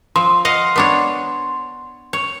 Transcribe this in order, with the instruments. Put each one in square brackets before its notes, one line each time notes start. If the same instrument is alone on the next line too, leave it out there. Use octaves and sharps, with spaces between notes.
[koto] F3 [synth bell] C6
[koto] D#5 F5 F#5
B3 D4 C#5
C#5